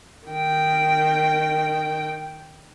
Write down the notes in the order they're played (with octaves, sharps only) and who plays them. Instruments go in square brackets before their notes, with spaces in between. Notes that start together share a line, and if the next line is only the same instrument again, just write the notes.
[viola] D#3 G5